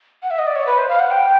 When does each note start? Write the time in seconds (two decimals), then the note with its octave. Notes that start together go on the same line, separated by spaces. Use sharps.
0.23 F#5
0.31 E5
0.39 D#5
0.47 D5
0.56 C#5
0.66 B4
0.78 C5
0.89 F5
1.00 F#5
1.11 G5